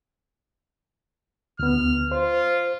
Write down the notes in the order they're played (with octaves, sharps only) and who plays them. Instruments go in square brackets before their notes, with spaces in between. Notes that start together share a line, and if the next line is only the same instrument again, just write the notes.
[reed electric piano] D2 B3 [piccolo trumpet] F6
[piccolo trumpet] F4 [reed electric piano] C5